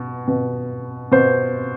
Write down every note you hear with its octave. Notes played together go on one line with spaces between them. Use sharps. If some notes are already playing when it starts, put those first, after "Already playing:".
Already playing: B2
B2
B2 C5